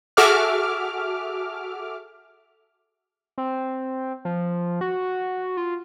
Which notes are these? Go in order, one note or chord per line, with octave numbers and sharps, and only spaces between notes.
F#4 G#4 A4 E5 D6 F6
C4
F3
F#4
F4